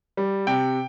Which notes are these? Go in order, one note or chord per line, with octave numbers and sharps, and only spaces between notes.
G3
C3 G5